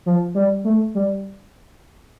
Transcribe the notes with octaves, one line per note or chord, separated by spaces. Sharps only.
F3
G3
A3
G3